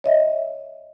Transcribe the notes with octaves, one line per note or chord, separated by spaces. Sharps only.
C#5 D#5 E5